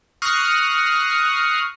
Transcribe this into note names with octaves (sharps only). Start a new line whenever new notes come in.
C#6 D#6 F6 F#6 A#6 C7